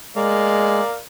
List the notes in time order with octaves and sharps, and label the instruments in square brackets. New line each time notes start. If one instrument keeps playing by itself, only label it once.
[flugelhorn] G#3 [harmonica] A#4 D5 F5